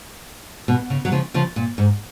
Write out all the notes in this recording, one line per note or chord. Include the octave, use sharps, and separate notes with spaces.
B2
C#3
F#3
C#3 F3
C#3 F3
A#2
G#2